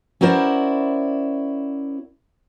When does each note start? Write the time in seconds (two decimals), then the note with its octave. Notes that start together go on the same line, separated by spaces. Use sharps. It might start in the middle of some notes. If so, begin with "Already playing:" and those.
0.21 C#4 E4 F#4 A#4 C5 D5